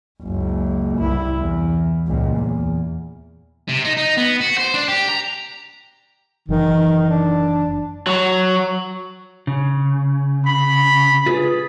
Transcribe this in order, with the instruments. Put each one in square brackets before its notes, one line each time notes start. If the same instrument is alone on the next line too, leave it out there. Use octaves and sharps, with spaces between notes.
[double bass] F#1 C#2
C2 E4
E2
C#2 A#2
E2
[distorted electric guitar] C3
D#4
D#4
B3
F#4
C5
D4
G4
A#5
[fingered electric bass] F#1 E3 [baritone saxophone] D#3
[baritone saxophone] D4
[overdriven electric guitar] F#3
[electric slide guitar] C#3
[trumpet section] B5
[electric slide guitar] F4 G#4 B4